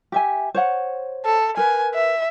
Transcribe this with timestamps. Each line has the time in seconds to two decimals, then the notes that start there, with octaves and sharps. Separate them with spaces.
0.12 G4 E5 G#5
0.55 C5 C#5 F#5
1.25 A4
1.57 A#4 B4 G#5
1.94 E5